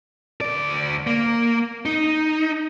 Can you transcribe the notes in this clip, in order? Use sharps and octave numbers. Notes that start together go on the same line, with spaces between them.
D2 D5
A#3
D#4